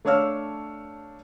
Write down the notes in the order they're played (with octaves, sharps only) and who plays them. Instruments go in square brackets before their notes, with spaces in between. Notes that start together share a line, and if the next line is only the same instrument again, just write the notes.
[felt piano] A3 D4 C#5 F5 E6 F6